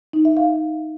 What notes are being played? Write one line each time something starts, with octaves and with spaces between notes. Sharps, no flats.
D#4
E5
F5